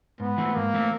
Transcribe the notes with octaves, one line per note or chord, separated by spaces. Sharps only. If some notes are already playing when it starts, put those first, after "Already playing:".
G#2 B3
E3 A3 C4
G#2 A#3
E3 A3 C4